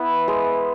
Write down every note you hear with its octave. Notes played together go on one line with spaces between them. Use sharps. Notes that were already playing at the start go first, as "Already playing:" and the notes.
Already playing: B3 E4 B4
G#3